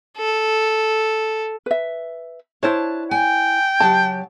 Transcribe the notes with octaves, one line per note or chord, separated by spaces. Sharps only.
A4
B4 E5
D4 E4 C5 C#5 A5
G5 G#5
C#3 F#3 G4 A5